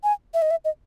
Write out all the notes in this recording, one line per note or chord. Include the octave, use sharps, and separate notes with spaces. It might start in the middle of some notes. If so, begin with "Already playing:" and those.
G#5
E5
D#5
E5
D#5